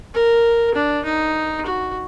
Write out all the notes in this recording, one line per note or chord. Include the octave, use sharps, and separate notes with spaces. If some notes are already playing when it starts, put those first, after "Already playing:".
A#4
D4
D#4
F#4